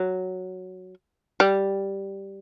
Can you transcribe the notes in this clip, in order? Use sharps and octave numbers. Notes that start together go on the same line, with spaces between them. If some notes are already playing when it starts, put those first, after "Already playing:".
Already playing: F#3
G3